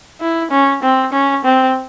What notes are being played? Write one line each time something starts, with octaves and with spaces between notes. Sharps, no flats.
E4
C#4
C4
C#4
C4